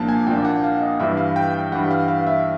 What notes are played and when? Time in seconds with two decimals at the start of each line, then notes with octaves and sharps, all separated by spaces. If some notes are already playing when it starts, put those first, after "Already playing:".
Already playing: C2 A#2 F3 A#3 D4 A5
0.09 G#5
0.27 C2 A#2 F3 A#3 D4 G5
0.45 F#5
0.64 F5
0.82 D#5
1.00 G2 E3 G3 E5
1.17 F5
1.36 G5
1.54 G5
1.72 G2 E3 G3 F#5
1.91 F5
2.08 F5
2.27 E5